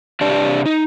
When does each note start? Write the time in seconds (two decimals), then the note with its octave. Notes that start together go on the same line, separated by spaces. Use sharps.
0.21 C3 D4 G4 D5 A5
0.66 D#4